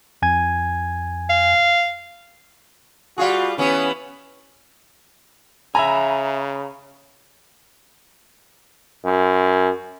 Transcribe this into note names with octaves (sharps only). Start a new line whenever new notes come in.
F2 G#5 G#6
F5
G3 F4 F#4 G#4
E3 B3 C#4
C#3 E5 G#5 A#5 B5
F#2